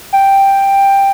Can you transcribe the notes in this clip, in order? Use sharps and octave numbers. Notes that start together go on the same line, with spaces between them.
G5